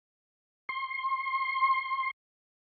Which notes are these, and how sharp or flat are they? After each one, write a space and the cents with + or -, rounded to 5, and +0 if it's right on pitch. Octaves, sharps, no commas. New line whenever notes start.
C6 +30